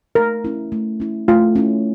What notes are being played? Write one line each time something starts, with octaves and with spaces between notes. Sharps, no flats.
A3 A#4
C#4 E4
A3
C#4 E4
A3 F4
C#4 E4